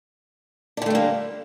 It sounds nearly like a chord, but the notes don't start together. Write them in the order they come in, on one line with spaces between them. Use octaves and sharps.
D4 D3 A3 G3 A#3